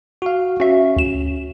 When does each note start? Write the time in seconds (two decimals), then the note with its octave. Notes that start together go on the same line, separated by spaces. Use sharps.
0.22 F#4 F5
0.60 C#4 F#4 E5
0.96 D2 E7